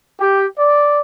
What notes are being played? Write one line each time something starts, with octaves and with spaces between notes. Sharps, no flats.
G4
D5